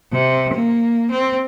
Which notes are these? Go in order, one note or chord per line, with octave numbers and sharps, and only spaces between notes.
C3
A#3
C4